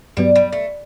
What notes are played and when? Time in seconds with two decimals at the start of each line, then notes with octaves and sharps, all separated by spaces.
0.17 G2 F#3 G3 B3
0.36 G3
0.53 A3